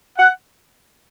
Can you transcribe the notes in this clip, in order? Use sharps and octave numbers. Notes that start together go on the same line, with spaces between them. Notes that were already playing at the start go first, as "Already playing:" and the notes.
F#5